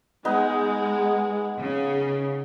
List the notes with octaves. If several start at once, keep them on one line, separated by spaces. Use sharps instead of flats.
G#3 B3 D#4
C#3